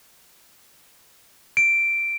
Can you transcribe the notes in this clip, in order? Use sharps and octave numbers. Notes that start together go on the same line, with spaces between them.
D7